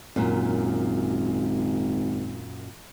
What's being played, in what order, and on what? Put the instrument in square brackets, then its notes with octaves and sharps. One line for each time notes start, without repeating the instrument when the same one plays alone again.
[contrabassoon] G#1 [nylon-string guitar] F#2 A#2